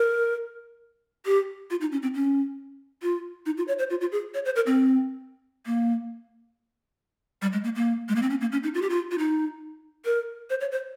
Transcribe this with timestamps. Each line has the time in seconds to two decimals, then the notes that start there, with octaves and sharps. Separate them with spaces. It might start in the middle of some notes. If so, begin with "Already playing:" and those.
Already playing: A#4
1.26 G4
1.70 F4
1.81 D#4
1.92 C#4
2.02 C4
2.14 C#4
3.02 F4
3.46 D#4
3.57 F4
3.68 C#5
3.79 C5
3.90 F4
4.01 F4
4.12 G#4
4.34 C#5
4.45 C5
4.56 A#4
4.67 C4
5.66 A#3
7.42 G3
7.53 G#3
7.64 A#3
7.75 A#3
8.09 G#3
8.16 A#3
8.22 C4
8.30 C#4
8.41 A#3
8.52 C#4
8.63 D#4
8.74 F4
8.82 G4
8.89 F4
9.11 F4
9.18 D#4
10.05 A#4
10.50 C5
10.61 C#5
10.72 C5